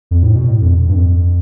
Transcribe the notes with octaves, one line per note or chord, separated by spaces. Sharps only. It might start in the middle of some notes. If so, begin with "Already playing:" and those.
F2
A2
B2
A2
F2
G2
F2